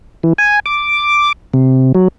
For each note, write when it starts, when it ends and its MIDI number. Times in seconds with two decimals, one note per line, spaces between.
0.23 0.33 52
0.38 0.60 80
0.66 1.32 86
1.54 1.92 48
1.95 2.08 54